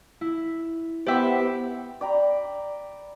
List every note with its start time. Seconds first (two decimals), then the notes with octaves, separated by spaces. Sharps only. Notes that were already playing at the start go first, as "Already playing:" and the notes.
0.21 E4
1.07 B3 G4 C5 E5 G5 D6
2.01 D5 G5 A#5 B5